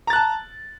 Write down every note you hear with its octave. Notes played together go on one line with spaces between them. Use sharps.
A5 A#5 F#6 A6